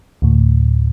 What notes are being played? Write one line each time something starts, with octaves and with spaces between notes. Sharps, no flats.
D2 A2